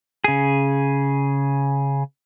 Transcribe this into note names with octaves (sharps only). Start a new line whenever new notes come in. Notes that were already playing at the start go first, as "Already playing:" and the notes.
C#3 G#4